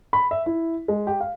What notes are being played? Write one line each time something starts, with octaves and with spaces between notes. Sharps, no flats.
B5
E5
E4
G#3
G4
F5